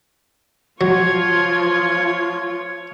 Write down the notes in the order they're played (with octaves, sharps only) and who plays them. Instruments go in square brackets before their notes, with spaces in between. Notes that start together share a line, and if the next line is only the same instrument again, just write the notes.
[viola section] F3 F4 [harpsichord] F#3 [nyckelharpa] C#5 [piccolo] G#6